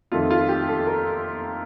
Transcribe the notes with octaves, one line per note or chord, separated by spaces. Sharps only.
F2 D#3 A3 F4
F4
G4
A4
A#4